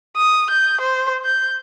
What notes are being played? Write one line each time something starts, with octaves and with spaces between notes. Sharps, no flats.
D#6
G6
C5
G6